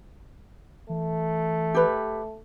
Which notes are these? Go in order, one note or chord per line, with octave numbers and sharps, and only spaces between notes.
E3 A3
G4 B4